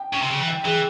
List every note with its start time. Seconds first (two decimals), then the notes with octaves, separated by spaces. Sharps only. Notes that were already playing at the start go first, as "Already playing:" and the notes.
Already playing: G5
0.13 C#3
0.22 C3
0.31 C#3
0.39 E3
0.48 G5
0.65 E3 G#4